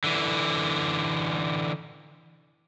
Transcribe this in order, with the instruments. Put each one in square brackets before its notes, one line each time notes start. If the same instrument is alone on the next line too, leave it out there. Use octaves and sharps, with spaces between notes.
[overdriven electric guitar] D3 E3